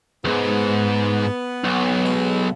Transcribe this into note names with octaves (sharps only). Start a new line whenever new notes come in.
E2 G#2 B3
B1
B2 G#3